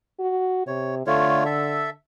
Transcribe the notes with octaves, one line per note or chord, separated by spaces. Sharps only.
F#4
C3 C#5
D3 A3 F4 C#5
A4 E5